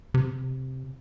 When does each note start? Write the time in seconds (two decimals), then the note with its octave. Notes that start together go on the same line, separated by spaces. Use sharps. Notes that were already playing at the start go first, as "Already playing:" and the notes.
0.14 C3